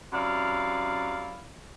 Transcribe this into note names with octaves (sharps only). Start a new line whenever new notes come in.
F#2 C3 E4 D5 F5